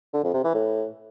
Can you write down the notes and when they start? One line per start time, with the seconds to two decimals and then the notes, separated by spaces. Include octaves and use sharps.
0.13 D3
0.24 F2
0.34 C3
0.44 E3
0.54 A2